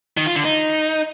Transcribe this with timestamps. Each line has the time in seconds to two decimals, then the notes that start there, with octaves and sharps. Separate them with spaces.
0.17 D#3
0.26 F4
0.36 D3
0.45 D#4